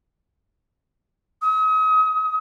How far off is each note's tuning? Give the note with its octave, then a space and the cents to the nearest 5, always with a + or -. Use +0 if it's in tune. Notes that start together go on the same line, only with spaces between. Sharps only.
D#6 +40